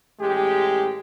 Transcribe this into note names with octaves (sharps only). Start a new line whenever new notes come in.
A1 G#3 G4